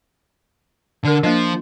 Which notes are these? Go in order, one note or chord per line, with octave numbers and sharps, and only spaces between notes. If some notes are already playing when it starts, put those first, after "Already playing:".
D3 D4 A#4
F3 A#3 D4 D#5